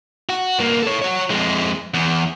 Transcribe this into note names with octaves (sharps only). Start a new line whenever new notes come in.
F#4
G2 A#3
A4 C#5
F#4 C#5
F2 G#3
E2